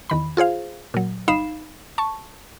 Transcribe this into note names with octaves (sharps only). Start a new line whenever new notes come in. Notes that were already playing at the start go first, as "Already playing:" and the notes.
E2 D#3 B5
F4 G#4 C5 F5
A#2 F#3
G1 D#4 F5 B5 C7 E7
A5 C#6